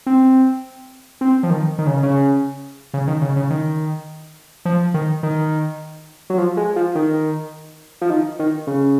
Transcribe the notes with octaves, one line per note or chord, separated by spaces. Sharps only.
C4
C4
F3
D#3
D#3
C#3
C#3
C#3
D#3
C#3
C#3
D#3
F3
D#3
D#3
F#3
F3
G#3
F3
D#3
F3
D#3
D#3
C#3